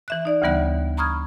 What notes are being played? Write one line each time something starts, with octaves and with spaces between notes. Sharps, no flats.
E3 E5 F#6
D#4 D5 E5
D2 C#3 E3 G3 B3 F#6
A#5 B5 C#6 D#6 F6 G#6